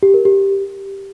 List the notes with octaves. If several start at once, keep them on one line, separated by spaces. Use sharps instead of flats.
G4
A#4
G4